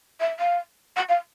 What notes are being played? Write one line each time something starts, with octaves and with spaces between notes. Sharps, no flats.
E5
F5
F#5
F5